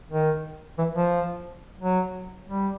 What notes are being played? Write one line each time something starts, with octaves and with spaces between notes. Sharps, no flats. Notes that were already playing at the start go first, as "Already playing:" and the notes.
D#3
E3
F3
F#3
G3